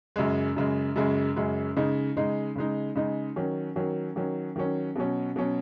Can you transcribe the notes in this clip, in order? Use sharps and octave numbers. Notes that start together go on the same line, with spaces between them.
F#2 C#3 G#3
F#2 C#3 G#3
F#2 C#3 G#3
F#2 C#3 G#3
C#3 G#3 D#4
C#3 G#3 D#4
C#3 G#3 D#4
C#3 G#3 D#4
D#3 F#3 C#4
D#3 F#3 C#4
D#3 F#3 C#4
D#3 F#3 C#4
B2 F#3 C#4
B2 F#3 C#4